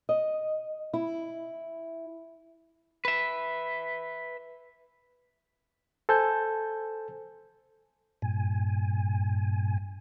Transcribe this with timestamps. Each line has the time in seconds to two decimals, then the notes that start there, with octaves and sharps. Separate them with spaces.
0.09 D#5
0.94 E4
3.05 B4 E5
6.09 A4 C5 G#5 A5 G6
8.22 G2 A#2 G#5